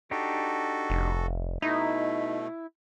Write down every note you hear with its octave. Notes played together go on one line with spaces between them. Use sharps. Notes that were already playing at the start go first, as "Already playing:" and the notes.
D4 D#4 F#4 G4 A4
F1
B2 A3 D#4 E4